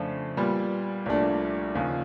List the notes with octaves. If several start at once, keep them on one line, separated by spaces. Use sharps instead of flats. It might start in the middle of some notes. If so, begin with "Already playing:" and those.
Already playing: F2 C#3 F3 A3 D4
A#2 G3 B3
C2 A#2 F3 A3 D4
D#2 C#3 F3